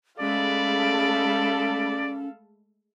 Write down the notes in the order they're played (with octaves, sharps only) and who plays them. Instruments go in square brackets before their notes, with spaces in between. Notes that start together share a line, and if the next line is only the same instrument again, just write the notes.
[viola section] G#3 A3 B5 [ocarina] C#4 [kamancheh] A4 F5 [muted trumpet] D5